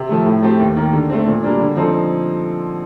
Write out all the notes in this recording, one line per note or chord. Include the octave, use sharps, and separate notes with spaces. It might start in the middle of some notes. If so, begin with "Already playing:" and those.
Already playing: C3
F3 A3
A2
A3 C4 G4
D#2
D#3 A#3
D3
A3 C4
A#2
G3 A#3 D4
D3
F3 C4 D#4 A4